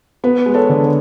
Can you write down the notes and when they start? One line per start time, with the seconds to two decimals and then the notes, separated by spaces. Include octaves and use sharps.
0.24 B3 B4
0.46 G#3
0.54 A4 C#5
0.69 D3
0.84 B4